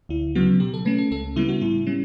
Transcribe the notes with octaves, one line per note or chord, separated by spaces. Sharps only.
D2 E4
C#3 F#3 B3 F#4
B2 G4
A4
A3 C#4 B4
A4
C#2 A4
C#3 G3 B3 E4
F#4
A2 E4
G3 C#4